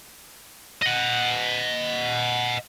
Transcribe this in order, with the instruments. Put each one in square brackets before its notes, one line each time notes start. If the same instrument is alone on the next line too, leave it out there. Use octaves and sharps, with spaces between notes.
[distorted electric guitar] D#5 F#5